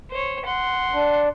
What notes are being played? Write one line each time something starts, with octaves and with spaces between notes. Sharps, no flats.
C5 C#5
F#5 C6
D4